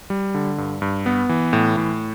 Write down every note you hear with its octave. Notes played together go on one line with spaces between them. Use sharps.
G3
D3
G2
G2
B3
E3
A2
A2